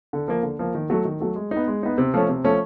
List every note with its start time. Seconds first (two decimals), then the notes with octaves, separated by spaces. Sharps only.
0.13 D3
0.28 F3 A#3
0.43 D3
0.59 F3 A#3
0.75 D#3
0.90 F#3 A3
1.05 D#3
1.20 F#3 A3
1.36 G#3
1.51 D#4
1.57 B3
1.68 G#3
1.83 B3 D#4
1.98 C3
2.14 F3 A3 C#4
2.29 C3
2.44 F3 A3 C#4